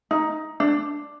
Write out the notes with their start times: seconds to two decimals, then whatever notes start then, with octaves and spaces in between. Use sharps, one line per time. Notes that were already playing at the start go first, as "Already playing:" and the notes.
0.11 D#4
0.60 D4